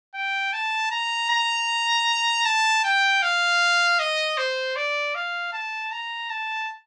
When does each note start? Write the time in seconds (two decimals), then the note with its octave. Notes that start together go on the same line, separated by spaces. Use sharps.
0.14 G5
0.53 A5
0.91 A#5
1.30 A#5
2.45 A5
2.84 G5
3.22 F5
3.99 D#5
4.37 C5
4.76 D5
5.15 F5
5.53 A5
5.92 A#5
6.30 A5